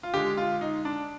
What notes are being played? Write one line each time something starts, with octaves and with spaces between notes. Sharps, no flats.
F4
D3 G#3 G4
F4
D#4
D4